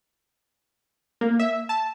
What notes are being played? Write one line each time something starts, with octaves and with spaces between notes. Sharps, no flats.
A#3
E5
A5